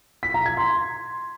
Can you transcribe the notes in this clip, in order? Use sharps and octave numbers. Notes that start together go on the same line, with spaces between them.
B6
A#5
G#6
C6